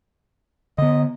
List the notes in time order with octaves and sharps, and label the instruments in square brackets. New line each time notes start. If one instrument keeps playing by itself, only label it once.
[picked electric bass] D3 B3 [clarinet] D#5